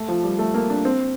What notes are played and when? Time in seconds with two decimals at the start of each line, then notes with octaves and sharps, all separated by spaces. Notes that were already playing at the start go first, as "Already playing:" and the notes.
Already playing: A3
0.08 F3
0.24 G3
0.39 A3
0.54 A#3
0.70 D4
0.85 C4